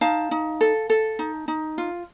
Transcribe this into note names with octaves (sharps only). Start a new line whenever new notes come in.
D#4 F5 A5
D#4
A4
A4
D#4
D#4
F4